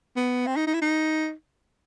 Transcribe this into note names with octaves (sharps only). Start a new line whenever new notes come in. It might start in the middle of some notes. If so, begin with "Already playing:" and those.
B3
C4
D#4
D#4
E4
D#4